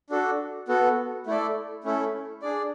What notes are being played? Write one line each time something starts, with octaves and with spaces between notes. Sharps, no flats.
D4 F#4 A4
B3 F#4 A4
A3 E4 A4 D5
A3 C#4 E4 A4
D4 G#4 D5